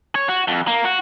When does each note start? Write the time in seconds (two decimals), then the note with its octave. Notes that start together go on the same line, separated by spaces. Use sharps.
0.15 C#5
0.29 F#4
0.48 F2
0.67 A#3
0.85 F#4